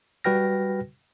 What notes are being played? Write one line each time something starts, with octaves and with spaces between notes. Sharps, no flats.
G3 F#4 B4 G5 F6 A#6